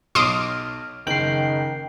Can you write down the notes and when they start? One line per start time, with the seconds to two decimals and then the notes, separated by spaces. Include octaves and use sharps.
0.15 B1 C6 D6 D#6 F6
1.07 F#1 D#3 G5 C7 F#7